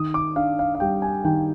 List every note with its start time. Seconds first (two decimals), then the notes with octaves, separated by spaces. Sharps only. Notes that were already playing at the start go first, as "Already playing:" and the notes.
Already playing: D#3 D#6
0.14 D6
0.36 D4 F5
0.59 F5
0.75 F5
0.80 G3 G5
1.02 G#5
1.24 D#3 G5